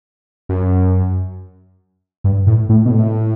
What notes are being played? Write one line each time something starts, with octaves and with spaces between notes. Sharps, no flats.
F#2
G2
A2
A2
B2
A2